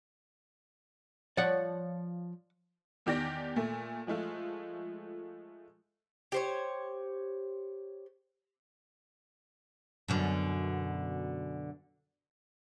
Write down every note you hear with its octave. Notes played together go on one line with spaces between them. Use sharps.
F3 C#5 D5 F#5
E2 D#3 G4 D5 A#6 D7
A#2 A3
F3 G#3 A3 F4
G4 C5 C#5
F#2 B2 D3